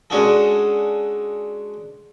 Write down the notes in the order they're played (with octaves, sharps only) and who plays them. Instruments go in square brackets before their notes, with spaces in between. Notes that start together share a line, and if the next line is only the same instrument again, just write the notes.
[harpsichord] G#3 C#4 D4 F#4 G#4 A4